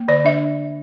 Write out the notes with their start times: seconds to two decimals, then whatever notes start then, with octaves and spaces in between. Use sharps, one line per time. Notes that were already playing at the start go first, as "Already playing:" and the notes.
Already playing: A#3
0.08 D3 D5
0.24 D4 E5